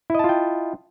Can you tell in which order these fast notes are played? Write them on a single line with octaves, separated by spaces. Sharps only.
E4 D#5 A5 F4 G5